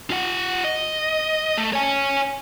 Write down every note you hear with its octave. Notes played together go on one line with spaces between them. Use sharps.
F4 F#5
D#5
A3
C#5 G#5